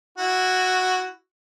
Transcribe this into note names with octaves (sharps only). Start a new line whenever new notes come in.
E4 F#4